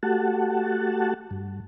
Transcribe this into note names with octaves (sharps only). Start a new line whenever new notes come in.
A3 F#4 G4 F#5 A5
G2